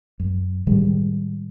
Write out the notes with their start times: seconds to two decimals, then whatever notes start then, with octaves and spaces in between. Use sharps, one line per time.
0.20 F#2
0.67 A2 D#3 G3 G#3